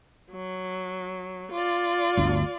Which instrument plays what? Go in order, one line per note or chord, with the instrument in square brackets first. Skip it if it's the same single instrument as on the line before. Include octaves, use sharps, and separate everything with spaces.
[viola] F#3
F4 D5
[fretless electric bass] G1 D2